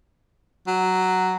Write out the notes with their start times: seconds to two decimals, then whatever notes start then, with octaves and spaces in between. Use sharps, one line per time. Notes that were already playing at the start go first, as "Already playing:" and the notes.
0.67 F#3